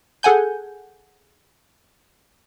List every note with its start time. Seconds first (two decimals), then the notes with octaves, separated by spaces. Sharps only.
0.23 G#4 A4 F#5 G#5 G6